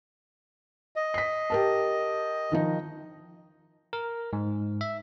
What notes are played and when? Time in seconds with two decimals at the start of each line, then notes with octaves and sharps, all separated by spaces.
0.96 D#5
1.14 B6 C7
1.50 G4 A#4 A5
2.52 D#3 F3 D#4
3.93 A#4
4.33 G#2
4.81 E5